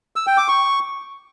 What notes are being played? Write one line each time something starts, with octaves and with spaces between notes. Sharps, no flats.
E6
G5
D6
C#6